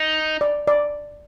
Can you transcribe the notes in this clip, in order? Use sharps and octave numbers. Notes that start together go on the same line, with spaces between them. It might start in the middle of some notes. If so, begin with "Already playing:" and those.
Already playing: D#4
D5
D5